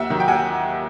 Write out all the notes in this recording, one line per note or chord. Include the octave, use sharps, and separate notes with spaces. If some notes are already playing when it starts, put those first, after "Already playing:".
Already playing: D#2 E5 F#5
D#3 F#3
G5
D#2 F#5 G#5